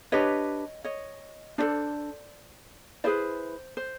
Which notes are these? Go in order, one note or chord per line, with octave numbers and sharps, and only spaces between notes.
D4 G4 B4 C#5 D#5
C#5 D#5
D4 F4 A4 C5 D5
E4 G#4 B4 C5 D5
C5